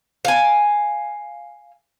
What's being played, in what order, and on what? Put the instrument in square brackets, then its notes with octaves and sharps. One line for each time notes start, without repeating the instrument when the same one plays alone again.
[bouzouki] F5 G#5